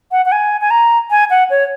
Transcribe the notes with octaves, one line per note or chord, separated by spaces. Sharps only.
F#5
F#5
G#5
G#5
A#5
G#5
F#5
C#5